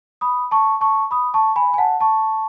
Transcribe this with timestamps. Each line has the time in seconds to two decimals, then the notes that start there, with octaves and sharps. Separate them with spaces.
0.21 B5 D#6
0.51 A5 C#6
0.81 A5 C#6
1.11 B5 D#6
1.34 A5 C#6
1.56 G#5 B5
1.74 G#5
1.78 F#5 A5
2.00 A5 C#6